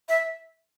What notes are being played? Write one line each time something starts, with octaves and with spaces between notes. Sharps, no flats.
E5